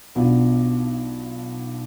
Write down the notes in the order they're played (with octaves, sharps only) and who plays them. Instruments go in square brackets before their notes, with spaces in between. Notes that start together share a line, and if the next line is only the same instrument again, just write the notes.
[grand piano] B1 B2 B3 D4 F4